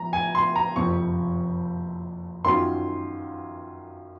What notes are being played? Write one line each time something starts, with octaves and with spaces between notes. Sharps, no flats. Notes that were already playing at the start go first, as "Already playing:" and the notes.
Already playing: F3 A#5
G#5
C6
A#5
F#1 F2 C3 F3 C4 C#6
F#2 D#3 F#3 C#4 F4 C6